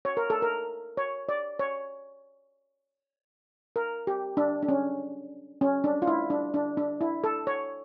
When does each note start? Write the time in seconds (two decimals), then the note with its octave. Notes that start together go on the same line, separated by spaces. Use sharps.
0.05 C#5
0.17 A#4
0.30 A4
0.42 A#4
0.97 C#5
1.29 D5
1.59 C#5
3.76 A#4
4.07 G4
4.37 D4
4.63 D4
4.69 C#4
5.61 C#4
5.84 D4
6.02 F4
6.07 E4
6.30 D4
6.54 D4
6.77 D4
7.01 E4
7.24 A4
7.47 C#5